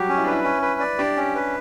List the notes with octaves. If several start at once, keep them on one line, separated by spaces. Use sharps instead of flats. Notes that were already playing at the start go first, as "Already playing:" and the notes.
Already playing: F#3 G3 F#4 G4
C#4
E4
D4 B4
E4
C#4 E4
B4
D5
D4 G4
C#4
B4